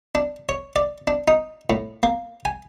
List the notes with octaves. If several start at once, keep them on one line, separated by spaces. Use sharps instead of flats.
D4
C#5
D5
D4
D#4
A2
A#3
G#5